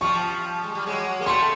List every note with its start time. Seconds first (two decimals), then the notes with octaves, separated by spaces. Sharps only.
0.01 F3 G3 C#6
0.63 G#3
0.75 G3
0.86 F#3 G#3
1.21 A#3
1.26 G3 A3 C6